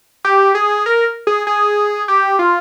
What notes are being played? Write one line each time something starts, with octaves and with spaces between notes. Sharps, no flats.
G4
G#4
A#4
G#4
G#4
G4
F4